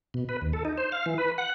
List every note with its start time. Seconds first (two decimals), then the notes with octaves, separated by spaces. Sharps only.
0.14 B2
0.29 B4
0.42 D#2
0.53 A4
0.65 D#4
0.78 C5
0.92 F5
1.06 E3
1.18 B4
1.38 F#5